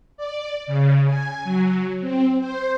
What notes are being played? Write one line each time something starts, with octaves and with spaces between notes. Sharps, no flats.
D5
C#3
G#5
F#3
C4
C5